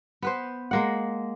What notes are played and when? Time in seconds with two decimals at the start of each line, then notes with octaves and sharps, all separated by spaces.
0.22 B3 B4 C5
0.71 G#3 A#3 F#5